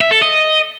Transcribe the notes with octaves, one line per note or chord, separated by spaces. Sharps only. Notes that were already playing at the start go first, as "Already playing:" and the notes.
E5
A4
D#5